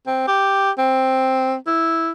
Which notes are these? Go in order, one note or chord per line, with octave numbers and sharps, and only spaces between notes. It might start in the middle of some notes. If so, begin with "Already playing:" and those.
C4
G4
C4
E4